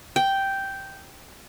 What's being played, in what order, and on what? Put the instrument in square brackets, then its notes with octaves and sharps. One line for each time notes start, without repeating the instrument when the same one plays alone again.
[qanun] G5